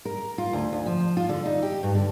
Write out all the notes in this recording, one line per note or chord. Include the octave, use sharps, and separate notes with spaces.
A#4
F4
D2
D2
F3
F4
D3
D#4
G4
G2
D3